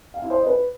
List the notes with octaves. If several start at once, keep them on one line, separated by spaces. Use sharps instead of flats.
F5
E4
C5
D#5
B4